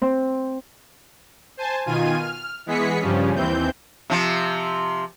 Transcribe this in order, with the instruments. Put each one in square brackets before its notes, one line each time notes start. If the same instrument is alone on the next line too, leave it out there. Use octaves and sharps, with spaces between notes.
[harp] C4
[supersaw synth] C5 G#5 A5
B2 D#3 F4 G#5 D#7
F6
E3 G#3 B3 G#4 B6 C#7
G2 C#3 F3 G3 C#4
D#2 E3 C4 G6
[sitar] C3 F3